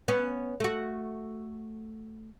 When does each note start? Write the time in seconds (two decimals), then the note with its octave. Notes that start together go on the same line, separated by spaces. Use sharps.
0.08 B3 C#4
0.60 A3 F#4